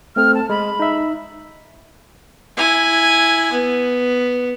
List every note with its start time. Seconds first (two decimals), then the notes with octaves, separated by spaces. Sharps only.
0.16 A3 C4 A4 F6
0.35 A5
0.50 G#3 B5
0.80 D#4 E5
2.57 E4 G#5
3.52 B3